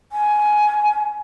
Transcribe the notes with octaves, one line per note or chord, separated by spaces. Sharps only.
G#5